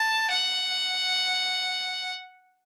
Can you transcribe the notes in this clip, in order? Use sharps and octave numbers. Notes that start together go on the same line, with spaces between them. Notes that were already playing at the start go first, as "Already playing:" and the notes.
Already playing: A5
F#5